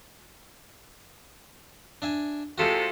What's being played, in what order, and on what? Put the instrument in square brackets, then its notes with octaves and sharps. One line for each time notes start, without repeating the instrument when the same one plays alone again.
[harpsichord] D4 E5 G#5
[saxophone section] C3 A4 [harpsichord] G#3 F4 F#4